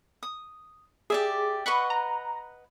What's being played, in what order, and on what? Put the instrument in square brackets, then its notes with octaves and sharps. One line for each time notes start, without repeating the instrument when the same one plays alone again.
[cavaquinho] D#6
[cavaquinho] G4 D5 E5 [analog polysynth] G#4
[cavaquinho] B4 D#5 F#5 [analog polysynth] B5 C#6
[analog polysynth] A#5